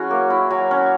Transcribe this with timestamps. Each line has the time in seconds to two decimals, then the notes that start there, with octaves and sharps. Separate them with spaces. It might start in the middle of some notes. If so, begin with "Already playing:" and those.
Already playing: F#3 C#4 E4 F#4 G#4
0.10 A#3
0.30 E4
0.50 F#3
0.71 C#4